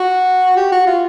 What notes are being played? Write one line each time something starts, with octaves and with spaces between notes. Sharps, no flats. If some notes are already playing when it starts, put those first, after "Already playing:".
Already playing: F#4
G4
F#4
F4